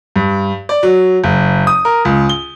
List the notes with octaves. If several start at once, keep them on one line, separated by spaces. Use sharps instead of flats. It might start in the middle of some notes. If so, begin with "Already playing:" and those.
G2
D5
F#3
F#1
D#6
A#4
C#2
G7